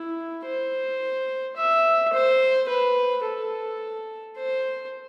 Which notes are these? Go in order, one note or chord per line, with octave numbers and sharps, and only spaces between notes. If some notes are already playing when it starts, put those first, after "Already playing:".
Already playing: E4
C5
E5
C5
B4
A4
C5